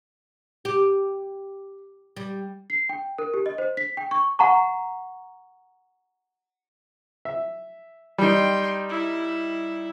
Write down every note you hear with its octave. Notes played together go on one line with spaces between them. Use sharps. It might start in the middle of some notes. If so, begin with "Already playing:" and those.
G4
G3
C7
G5
A#4
G4
D#5
C5
B6
G5
C#6
F#5 A#5 C#6
E5
G3 D#4 G5 C6
E4